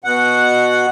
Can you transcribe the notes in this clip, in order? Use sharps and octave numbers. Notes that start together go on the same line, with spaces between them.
B2 F#5